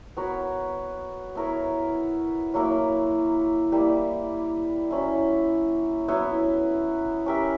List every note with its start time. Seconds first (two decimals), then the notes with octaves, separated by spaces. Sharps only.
0.17 B3 F#4 A#4 C#5
1.35 B3 E4 A#4 C#5
2.54 F#3 A#3 E4 A#4
3.72 G3 A#3 E4
4.91 F#3 C#4 E4
6.08 F#3 B3 E4
7.26 C#4 G4 A#4 E5